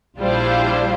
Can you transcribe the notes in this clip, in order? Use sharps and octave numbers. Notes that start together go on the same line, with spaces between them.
A#1 G3 D4 E4 F4 C5